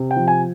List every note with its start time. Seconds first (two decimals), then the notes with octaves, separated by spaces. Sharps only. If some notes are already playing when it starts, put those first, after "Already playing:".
Already playing: C3
0.11 G5
0.16 F3
0.28 G#5